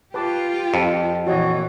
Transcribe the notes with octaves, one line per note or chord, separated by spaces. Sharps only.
F4 G4 B4 A5 D6
F2
A#2 E3 F#4 C#5 D#5